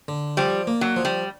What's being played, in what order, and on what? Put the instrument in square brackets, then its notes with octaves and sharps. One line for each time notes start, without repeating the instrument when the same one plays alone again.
[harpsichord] D3
[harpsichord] F3 [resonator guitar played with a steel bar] G3
[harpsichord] A#3
[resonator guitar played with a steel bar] F#3
[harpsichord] F3
[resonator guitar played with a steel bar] G3